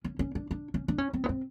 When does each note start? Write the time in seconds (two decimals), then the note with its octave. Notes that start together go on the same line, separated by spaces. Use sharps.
0.04 C#4
0.19 C#4
0.35 D4
0.51 D4
0.74 C#4
0.88 D4
0.98 C#4
1.13 C4
1.24 B3
1.29 C4